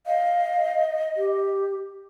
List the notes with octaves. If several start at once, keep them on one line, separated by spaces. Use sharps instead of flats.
D#5 F5
G4